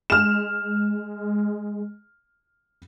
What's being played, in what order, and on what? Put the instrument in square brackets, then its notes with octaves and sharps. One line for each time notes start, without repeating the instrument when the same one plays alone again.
[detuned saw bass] G#3 [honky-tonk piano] F6 E7